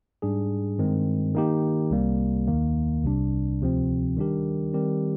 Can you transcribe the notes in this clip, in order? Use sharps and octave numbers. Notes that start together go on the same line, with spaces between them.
G#2 G3 D4 G#4
G2 D#3 G#3 C4
D#3 A#3 D#4 G4
C2 C3 G3 A#3
D#2 D#3 A#3
C2 C3 G3 D4
D2 C3 F3 C4
D#3 G3 D4 G4 A#4
D#3 G3 C4 G4 A#4